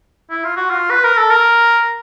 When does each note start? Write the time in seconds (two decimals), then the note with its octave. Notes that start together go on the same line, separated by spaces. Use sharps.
0.30 E4
0.44 F4
0.56 F#4
0.70 F4
0.91 B4
1.04 A#4
1.17 A4
1.31 A#4